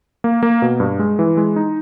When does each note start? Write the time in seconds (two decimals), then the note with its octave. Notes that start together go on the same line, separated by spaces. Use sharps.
0.24 A#3
0.43 A#3
0.62 B2
0.80 G2
0.99 G#3
1.19 E3
1.37 G#3
1.56 D#4